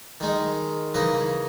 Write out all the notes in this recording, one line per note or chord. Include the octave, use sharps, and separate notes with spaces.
D#3 G#3 D#4
C#3 E3 A#3 D#4 B4 D#5